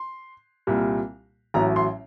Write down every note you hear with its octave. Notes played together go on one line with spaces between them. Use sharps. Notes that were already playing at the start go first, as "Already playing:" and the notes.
Already playing: C6
C2 A#2 G3
A1 A2 F#3 A#5
C6